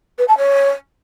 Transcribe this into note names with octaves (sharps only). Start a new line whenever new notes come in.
B4
A5
C#5